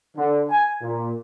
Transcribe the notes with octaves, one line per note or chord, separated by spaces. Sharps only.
D3
G#5
A#2